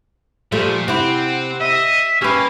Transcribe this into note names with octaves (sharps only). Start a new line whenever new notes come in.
A#2 F3 G3 A3
C3 C4 E4 F#5
D#5 E5
A#3 C#4 G4 B4